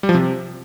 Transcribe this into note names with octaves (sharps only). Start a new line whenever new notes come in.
G3
F3
C3